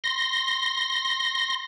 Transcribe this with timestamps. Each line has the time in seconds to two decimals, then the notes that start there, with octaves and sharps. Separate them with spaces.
0.04 C6 A#6